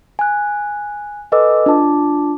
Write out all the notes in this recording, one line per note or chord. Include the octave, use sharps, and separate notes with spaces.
G#5 F#6
A4 B4 D#5 G#5 D6 E6
D4 F4 A5 D6